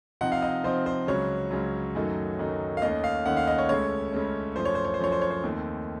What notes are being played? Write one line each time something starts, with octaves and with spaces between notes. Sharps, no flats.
C3 F3 C4 D#4 F#5
F5
D#5
C3 F3 C4 D#4 C5
C5
C#2 C#3 F#3 C#5
C#2 C#3 F#3
F#2 D#3 F#3 A3 D#4
F#2 D#3 F#3 A3 D#4
F5
D#2 D#3 A3 C#4 D#5
F5
D#2 D#3 A3 C#4 F#5
F5
D#5
C#5
C#2 C#3 A3 C#4 C#5
C#2 C#3 A3 C#4
F#2 F3 A3 C5
C#5
C5
C#5
C5
F#2 F3 A3 C#5
C5
C#5
C5
D#2 D#3 A3 C4